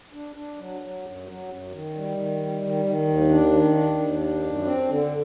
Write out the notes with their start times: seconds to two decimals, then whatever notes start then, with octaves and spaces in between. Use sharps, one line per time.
0.13 D4
0.36 D4
0.58 F#3
0.81 F#3
1.04 F#2
1.26 F#3
1.49 F#2
1.72 D#3
1.94 G3
2.17 D#3
2.39 G3
2.62 D#3
2.85 D#3
3.07 D#2
3.30 D4
3.52 D#3
3.75 D4
3.98 D#2
4.21 D4
4.43 F#2
4.65 C4
4.89 D3